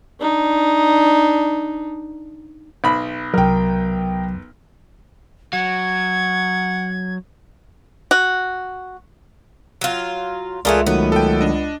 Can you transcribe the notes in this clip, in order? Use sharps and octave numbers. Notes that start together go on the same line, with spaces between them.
D4 D#4
B1 B5
C2 F#3 A#4 G5
F#3 F#5 G#6
F#4
F#3 F4
C#2 E3 A3 F4 G#4 A#4 D5
D#3 F#3 A3 B3
A4 G5
D4 D#5